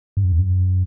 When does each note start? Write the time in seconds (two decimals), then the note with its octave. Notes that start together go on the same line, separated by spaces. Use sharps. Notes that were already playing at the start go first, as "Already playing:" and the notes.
0.17 G2
0.24 F#2
0.32 E2
0.39 F#2